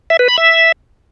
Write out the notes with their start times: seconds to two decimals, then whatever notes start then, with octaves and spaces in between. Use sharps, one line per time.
0.10 E5
0.19 B4
0.28 B5
0.38 E5